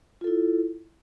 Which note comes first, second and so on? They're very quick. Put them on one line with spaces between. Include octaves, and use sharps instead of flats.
F4 A4 E4